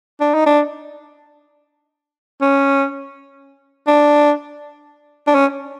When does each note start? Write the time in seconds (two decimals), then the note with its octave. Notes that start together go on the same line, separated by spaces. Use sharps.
0.21 D4
0.34 D#4
0.46 D4
2.41 C#4
3.87 D4
5.27 D4
5.35 C#4